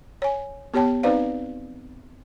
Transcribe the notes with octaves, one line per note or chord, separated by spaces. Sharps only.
C#5 G#5
B3 G4 C#5 G5 A5
C4 D#4 B4 C5 D5 F5